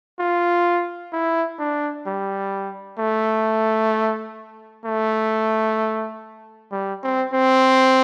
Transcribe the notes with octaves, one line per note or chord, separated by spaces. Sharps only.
F4
E4
D4
G3
A3
A3
G3
C4
C4